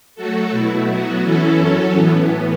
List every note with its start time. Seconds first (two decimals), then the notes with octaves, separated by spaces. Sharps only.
0.15 F#3 A3 F#4 A4
0.51 B2 A3 E4
0.87 F#3 B3 F#4
1.22 E3 C#4 E4 A4
1.58 F#2 F#3 C#4 A4
1.93 A2 E3 B3